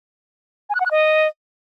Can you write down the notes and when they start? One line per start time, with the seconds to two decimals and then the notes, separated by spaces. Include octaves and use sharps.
0.70 G#5
0.75 F#6
0.80 F#5
0.86 F#6
0.91 D#5